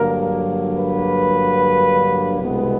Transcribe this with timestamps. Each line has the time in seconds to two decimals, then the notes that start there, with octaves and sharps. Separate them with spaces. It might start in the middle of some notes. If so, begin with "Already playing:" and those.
Already playing: G2 D3 F#3 A#3 A#4
0.76 B4
2.41 C2 B2 G#3 B3